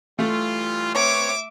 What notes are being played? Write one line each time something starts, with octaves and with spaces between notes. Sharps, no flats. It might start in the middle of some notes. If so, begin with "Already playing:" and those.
E3 G3 A3 F4
C4 B4 C#5 E5 D6